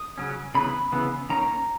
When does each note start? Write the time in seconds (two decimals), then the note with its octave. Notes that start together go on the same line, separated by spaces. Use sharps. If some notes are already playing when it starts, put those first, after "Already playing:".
Already playing: D#6
0.18 C#3 F#3 C#4
0.55 C#3 E3 B3 B5
0.92 C#3 E3 B3
1.30 D#3 A#3 C#4 A#5